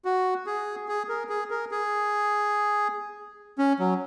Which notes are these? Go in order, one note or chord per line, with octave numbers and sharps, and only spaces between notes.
F#4
G#4
G#4
A#4
G#4
A#4
G#4
C#4
F#3